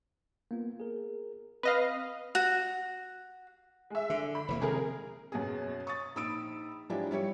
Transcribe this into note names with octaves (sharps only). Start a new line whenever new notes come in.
A#3 B3 F4
G#4 A#4
C4 B4 D#5 F5
F#4
G#3 E5
D3
B5
F1 E3 A#3
C3 D#3 G#3 G#4 A#4
F#2 B2 G#4
C#6 D#6 A6
A#1 D#4 B5 D#6 E6 D7
F3 F#3 G#3 D4 E4 G4
G3 E4 G4 C#5